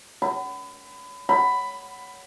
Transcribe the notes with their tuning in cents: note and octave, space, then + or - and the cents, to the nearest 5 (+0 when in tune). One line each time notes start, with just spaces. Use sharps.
B5 +30
B5 +10